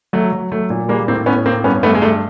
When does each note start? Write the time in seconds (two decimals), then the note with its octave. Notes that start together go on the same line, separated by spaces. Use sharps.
0.13 F#3 A3
0.32 F#3
0.52 F#3 A3
0.70 A#2
0.88 G3 G#3 A#3
1.08 A2 A#3 C4
1.26 A2 B3 C#4
1.45 A2 A#3 C4
1.64 G2 B3 C#4
1.83 G2 A3 B3
1.95 G#3
2.02 G2 A3